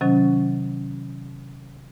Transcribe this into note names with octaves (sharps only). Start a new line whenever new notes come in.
C3 D#3 F#3 C#4